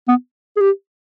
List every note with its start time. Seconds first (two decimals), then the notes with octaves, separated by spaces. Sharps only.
0.08 B3
0.57 G#4
0.61 G4